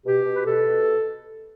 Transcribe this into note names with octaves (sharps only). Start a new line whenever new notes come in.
B2 G4
B2
B4
B2 A4
B2